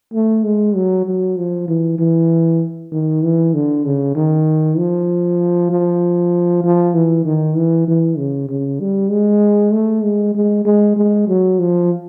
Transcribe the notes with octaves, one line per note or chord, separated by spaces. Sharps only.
A3
G#3
F#3
F#3
F3
E3
E3
D#3
E3
D3
C#3
D#3
F3
F3
F3
E3
D#3
E3
E3
C#3
C#3
G3
G#3
A3
G#3
G#3
G#3
G#3
F#3
F3